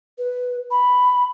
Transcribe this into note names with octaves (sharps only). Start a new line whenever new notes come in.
B4
B5